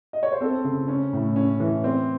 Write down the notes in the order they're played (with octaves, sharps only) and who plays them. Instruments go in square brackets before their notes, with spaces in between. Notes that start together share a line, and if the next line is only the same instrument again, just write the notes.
[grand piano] D#5
C#5
C5
C4 A4
C#3
C#4
A2
C#4
E3
C4